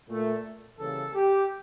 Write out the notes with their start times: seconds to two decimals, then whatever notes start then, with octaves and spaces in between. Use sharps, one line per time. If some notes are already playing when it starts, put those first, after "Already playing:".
0.09 A#2 A3
0.78 C#3 E3 G3 A#3 A4
1.14 G4